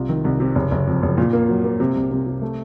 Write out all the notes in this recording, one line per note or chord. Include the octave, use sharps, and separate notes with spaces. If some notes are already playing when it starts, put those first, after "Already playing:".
Already playing: C2 F4
D#3
C2
C3
F#1
F#1
F2
F#1
A#2
A#3
F#3
A#3
C3
C2
C3
C3
A3